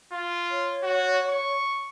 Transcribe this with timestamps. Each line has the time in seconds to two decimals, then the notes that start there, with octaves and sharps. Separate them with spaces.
0.13 F4
0.51 C#5
0.83 F#4
1.29 C#6